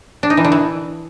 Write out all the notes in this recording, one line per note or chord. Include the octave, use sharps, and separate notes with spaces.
D4
D#4
E3
D3
E3